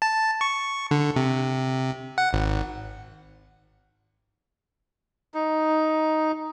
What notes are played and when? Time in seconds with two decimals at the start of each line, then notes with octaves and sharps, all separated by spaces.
0.02 A5
0.41 C#6
0.91 D3
1.16 C3
2.18 F#5
2.33 G#1
5.34 D#4